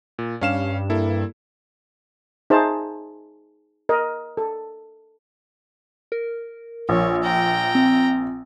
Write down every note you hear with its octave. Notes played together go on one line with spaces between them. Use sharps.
A#2
G2 C#4 F5 E7
A#3 E4 A4
D#4 G#4 C5 E5 A5
A#4 D#5
A4
A#4
A#1 C#5
G5 A#5
C4